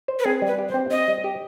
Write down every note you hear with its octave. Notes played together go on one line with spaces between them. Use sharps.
C5
B4
C4 G#4
G3
B4
G4
C5
C4
C4 D#5
G3
G4